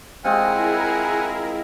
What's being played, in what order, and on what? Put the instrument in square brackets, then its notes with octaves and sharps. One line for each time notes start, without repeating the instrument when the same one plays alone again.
[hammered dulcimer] G#3 C4 F4 [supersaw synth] E4 G#4 A#4 [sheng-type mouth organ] F#5 G#5